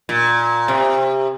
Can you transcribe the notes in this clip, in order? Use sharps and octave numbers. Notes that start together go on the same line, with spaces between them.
A#2
C3